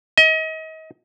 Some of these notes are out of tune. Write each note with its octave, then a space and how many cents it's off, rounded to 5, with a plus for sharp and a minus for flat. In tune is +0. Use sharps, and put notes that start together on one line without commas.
D#5 +35